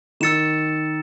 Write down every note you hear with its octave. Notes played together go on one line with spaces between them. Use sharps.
D#3 E6 A6 C#7 E7